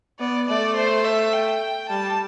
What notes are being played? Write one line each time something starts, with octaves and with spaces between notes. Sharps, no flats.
B3 D5
A3 D5
C5
E5
G5
G3 A5